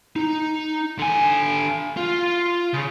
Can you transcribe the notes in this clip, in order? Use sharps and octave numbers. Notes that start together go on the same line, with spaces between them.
D#4
D3 G#5
F4
C#3